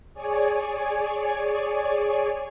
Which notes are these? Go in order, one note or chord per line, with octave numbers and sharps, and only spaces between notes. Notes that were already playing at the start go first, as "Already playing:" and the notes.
G#4 C#5 D5 G#5